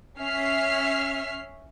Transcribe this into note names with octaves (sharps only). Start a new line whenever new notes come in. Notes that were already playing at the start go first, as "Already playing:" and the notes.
C#4 E5 F6 C7